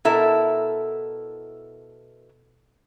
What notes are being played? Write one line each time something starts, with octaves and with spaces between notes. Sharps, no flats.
B2 E4 A4 A#4 E5 A5